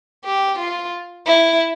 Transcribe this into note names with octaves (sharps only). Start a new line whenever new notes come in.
G4
F4
E4